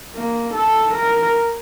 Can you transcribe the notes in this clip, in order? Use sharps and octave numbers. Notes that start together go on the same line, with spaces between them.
A#3
A4
A#4